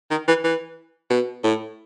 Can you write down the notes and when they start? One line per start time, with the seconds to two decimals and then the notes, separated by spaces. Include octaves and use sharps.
0.11 D#3
0.28 E3
0.44 E3
1.10 B2
1.44 A2